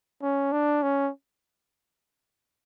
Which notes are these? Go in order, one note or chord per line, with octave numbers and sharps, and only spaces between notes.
C#4
D4
C#4